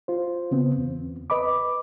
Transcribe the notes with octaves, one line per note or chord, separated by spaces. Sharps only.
F4 C5
C#3 B3 C4
E2
B4 D#5 B5 D6